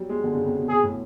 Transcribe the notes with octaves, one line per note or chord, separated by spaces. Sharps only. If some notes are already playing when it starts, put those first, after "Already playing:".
Already playing: F#3 G3
G#3
D3
C#3
C3
B2
B2 G#4
A2